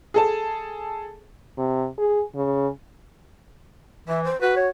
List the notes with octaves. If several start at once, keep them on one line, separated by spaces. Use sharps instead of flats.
G#4 A4 A5
C3
G#4
C#3
E3 E5
C5
F#4 B4
C#5